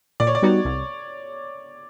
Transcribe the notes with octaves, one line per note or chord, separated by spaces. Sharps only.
A#2 D5
C#5
D5
G3 B3 D#4 F#4
C2